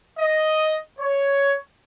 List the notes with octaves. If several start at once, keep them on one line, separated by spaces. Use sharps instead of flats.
D#5
C#5